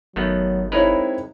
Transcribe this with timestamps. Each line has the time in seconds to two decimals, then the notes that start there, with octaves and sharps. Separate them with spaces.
0.16 G1 D#3 F#3 A3 B3
0.72 G#3 C4 D#4 E4 A#4 B4 C#5